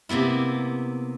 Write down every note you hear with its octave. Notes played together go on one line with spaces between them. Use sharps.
C3 A#3 B3 E4